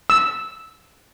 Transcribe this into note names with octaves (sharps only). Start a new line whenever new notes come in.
E6